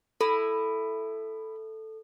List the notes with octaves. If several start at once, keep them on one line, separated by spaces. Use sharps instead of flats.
E4 A4